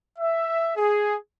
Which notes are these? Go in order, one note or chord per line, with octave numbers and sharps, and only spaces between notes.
E5
G#4